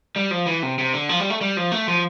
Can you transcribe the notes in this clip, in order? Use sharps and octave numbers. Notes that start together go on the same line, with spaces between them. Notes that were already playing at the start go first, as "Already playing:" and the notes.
G3
F3
E3
C3
C3
D3
F3
G3
A3
G3
F3
A3
F3